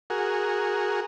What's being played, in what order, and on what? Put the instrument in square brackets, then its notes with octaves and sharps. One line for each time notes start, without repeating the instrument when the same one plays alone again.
[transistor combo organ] F#4 G#4 A#4